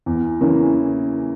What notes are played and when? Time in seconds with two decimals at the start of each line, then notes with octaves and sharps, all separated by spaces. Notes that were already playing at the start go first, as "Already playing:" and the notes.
0.06 E2
0.41 C#3 E3 A#3 C#4